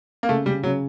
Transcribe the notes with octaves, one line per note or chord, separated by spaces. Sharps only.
A#3
C#3 A3
C#3 G3
C#3 F#3